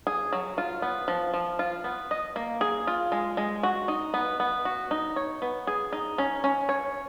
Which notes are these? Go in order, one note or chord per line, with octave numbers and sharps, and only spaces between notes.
G#4
F#3
F4
B3
F3
F3
F4
B3
D#5
A#3
G#4
F4
G#3
G#3
F#4
D#4
B3
B3
F#4
D#4
C#5
B3
G#4
D#4
C#4
C#4
C#5